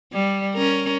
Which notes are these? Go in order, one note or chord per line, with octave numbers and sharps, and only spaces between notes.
G3
C#4 A#4